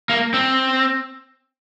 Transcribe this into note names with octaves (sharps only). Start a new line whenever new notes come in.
A#3
C4